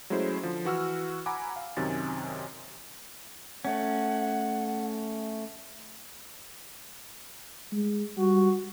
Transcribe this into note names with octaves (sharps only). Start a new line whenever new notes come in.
F#3 G#3 A3 C#4 E4 C5
D3 F3
E3 F#4 E6 F6
F#5 G#5 A#5 B5 D6
F5
F#2 C3 D#3 G#5 A6
A3 C#4 F#5
G#3
G3 F#4